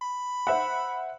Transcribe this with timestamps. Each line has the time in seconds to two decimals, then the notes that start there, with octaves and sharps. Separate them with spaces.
0.02 B5
0.47 C5 E5 F#5